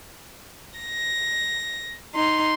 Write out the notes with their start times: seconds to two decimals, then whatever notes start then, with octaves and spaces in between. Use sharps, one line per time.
0.79 A#6
2.15 D#4 C6